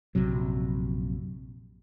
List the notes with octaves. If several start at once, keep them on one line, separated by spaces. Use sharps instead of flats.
A#1 F#2 C3 F#3